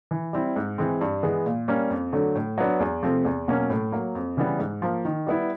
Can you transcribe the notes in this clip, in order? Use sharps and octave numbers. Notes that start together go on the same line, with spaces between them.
E3
G3 C4 E4
G#2
E3 G#3 C4
G2
E3 G#3 B3
A#2
G3 A#3 C#4
F2
D3 F#3 A3
A2
F#3 B3 D4
E2
C3 F3 A3 C4
E2
B2 F#3 A#3 C#4
A2
F#3 A#3
F2
C#3 E3 G3 B3
G#2
F3 A#3
D#3
G3 B3 E4